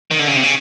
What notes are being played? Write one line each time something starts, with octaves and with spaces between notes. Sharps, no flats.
D#3
D3
C#3
C3
C#3